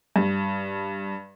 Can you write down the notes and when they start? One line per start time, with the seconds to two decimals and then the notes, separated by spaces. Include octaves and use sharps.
0.16 G2